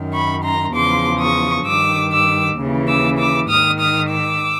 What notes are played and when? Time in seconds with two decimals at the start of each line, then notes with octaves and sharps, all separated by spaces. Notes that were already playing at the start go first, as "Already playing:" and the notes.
Already playing: F#2 D#3
0.13 B5 C#6
0.44 A#5 C6
0.74 E2 C#3 F3 C6 D6
1.20 C#6 D#6
1.66 G2 D#3 D6 E6
2.11 D6 E6
2.57 D#2 C#3 E3
2.88 D6 E6
3.18 D6 E6
3.49 G#2 D#3 D#6 F6
3.79 D#6 F6
4.09 D6 E6